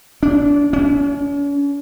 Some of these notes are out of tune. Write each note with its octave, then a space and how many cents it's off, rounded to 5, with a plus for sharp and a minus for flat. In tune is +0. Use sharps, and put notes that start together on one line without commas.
D4 -25
C#4 +40